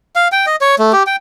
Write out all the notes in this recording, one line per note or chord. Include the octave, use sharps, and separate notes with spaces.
F5
G5
D#5
C#5
A3
G4
G5